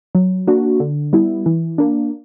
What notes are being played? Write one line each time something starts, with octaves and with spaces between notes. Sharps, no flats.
F#3
A#3 D4 F#4
D3
G3 B3 E4
E3
A#3 D4